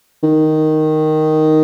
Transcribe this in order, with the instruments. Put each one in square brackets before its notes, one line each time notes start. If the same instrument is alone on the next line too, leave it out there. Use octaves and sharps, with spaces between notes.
[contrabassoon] D#3